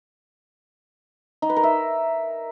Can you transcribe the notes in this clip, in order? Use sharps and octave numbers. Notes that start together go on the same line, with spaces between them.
D#4
B4
A#4
E5